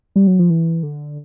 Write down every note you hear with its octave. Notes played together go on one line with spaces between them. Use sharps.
G3
F#3
F3
E3
D3